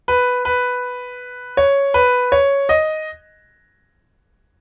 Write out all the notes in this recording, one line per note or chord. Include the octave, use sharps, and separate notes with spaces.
B4
B4
C#5
B4
C#5
D#5